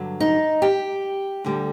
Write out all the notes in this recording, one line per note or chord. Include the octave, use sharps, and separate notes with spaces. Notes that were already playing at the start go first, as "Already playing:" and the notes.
Already playing: G2 D3 F#3
D#4
G4
D2 D3 G3